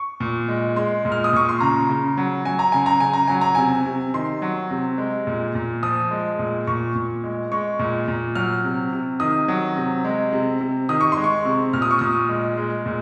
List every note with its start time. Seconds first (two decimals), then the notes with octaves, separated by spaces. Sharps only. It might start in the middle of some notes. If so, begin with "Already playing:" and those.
Already playing: C#6
0.20 A#2
0.48 G#3
0.76 G#3 C6
1.05 A#2
1.12 F6
1.24 D#6
1.33 A#2 C#6
1.49 C6
1.61 C#3 A#5
1.89 C#3
2.17 F#3
2.45 F#3 G#5
2.59 A#5
2.72 C#3 G#5
2.86 A#5
3.00 C#3 G#5
3.13 A#5
3.28 F#3 G#5
3.41 A#5
3.55 C3 G#5
3.86 C3
4.14 D#3 C6
4.42 F#3
4.70 C3
4.98 G#3
5.27 A#2
5.55 A#2
5.83 F3 D#6
6.11 G#3
6.39 A#2
6.67 A#2 C#6
6.95 A#2
7.24 G#3
7.52 G#3 C#6
7.79 A#2
8.08 A#2
8.35 F#3 F6
8.64 C3
8.92 C3
9.20 D#3 D#6
9.48 F#3
9.76 C3
10.05 G#3
10.33 C3
10.61 C3
10.89 D#3 D#6
11.01 C#6
11.12 C6
11.17 G#3
11.24 C#6
11.45 C3
11.73 A#2 F6
11.82 D#6
11.91 C#6
11.99 A#2 D#6
12.29 G#3
12.58 G#3
12.86 A#2